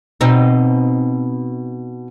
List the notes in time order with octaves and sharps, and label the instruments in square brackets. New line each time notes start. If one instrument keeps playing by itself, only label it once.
[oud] B2 C4 D#4